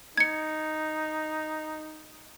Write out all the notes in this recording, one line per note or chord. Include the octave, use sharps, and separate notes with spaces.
D#4 G#6 C#7